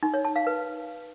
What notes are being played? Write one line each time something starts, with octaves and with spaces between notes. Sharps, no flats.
D#4
C#5
A5
F5
B4